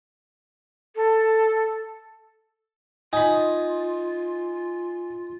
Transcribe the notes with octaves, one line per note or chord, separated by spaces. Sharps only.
A4
D#4 F4 G#5 B5